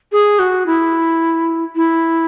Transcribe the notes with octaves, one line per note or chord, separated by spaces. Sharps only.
G#4
F#4
E4
E4